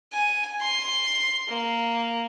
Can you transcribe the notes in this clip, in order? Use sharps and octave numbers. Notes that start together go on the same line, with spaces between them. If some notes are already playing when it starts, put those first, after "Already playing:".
G#5
C6
A#3